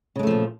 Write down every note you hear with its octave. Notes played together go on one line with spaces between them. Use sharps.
A#2 C#3 F3 G#3 A3